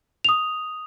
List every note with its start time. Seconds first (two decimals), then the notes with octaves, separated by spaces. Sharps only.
0.24 D#6 F7